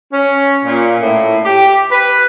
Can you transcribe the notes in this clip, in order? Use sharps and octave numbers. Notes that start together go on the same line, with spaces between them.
C#4
A#2
A2
G4
B4